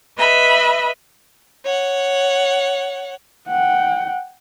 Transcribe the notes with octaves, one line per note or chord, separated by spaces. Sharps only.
B4 D#5 E5 B5
C#5 F#5
F#5 G5